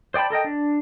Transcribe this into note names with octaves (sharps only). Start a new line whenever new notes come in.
C5 D5 G5 A5 B5
A4 A#4 D#5 G5
D4